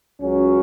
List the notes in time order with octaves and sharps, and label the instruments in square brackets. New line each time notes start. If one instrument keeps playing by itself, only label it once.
[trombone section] C#2 C#3 F#3 C#4